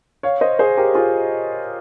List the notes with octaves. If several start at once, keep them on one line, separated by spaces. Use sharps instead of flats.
C#5 F5
C5 D#5
G#4 C5
G4 A#4
F4 G#4